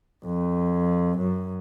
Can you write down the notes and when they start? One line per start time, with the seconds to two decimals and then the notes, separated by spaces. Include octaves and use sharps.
0.25 F2
1.17 F#2